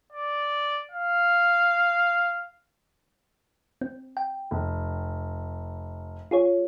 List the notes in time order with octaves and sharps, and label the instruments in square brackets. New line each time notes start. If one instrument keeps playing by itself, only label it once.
[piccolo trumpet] D5
F5
[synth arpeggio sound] C4
G5
[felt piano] F1
[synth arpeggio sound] F4 G#4 C#5